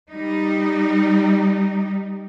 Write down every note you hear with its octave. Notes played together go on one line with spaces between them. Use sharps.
G3 D#4